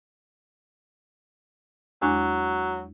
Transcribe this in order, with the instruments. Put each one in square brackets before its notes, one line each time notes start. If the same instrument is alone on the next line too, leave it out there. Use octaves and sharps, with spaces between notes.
[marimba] E2 G#3 D4 [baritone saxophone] F#3